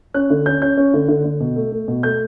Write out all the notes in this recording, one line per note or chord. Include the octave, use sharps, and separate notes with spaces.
C#4 F#6
D3
C#4 G6
C#4 G6
C#4
D3
D3
D3
B2
A3
A3
B2
A3 G6